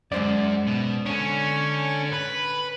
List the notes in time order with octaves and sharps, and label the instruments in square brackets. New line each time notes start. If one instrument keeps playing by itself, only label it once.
[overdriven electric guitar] F#2 [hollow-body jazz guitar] G#3 C5 D5
[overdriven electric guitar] B2
[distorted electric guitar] C#4 [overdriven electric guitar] D4 A4
[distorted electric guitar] B4 [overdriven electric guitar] B5